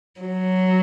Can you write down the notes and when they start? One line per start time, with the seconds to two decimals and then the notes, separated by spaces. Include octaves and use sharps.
0.21 F#3